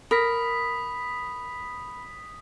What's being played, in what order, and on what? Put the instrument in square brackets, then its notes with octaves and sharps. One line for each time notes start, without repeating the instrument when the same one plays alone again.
[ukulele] A#4 [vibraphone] B5 [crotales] D#6 B6